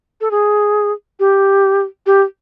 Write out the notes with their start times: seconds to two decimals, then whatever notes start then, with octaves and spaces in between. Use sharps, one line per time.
0.21 A4
0.31 G#4
1.20 G4
2.06 G4